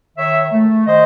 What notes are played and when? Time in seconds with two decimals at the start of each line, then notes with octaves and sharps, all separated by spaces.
0.17 D#3 C#5 E5
0.52 A3
0.87 D#3 C5 D#5